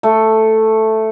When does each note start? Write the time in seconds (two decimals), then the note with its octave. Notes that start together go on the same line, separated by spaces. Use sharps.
0.03 A3